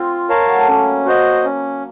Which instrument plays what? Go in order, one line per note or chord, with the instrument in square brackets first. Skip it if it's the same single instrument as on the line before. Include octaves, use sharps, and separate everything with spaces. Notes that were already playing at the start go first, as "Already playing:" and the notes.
Already playing: [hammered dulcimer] C4 [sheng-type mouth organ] F4
[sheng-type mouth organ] A#4 C#5 F5 A5
[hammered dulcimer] F#3
A3
[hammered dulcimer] A#3 [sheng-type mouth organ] C#4
[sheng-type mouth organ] F#4 C5 D#5
C#4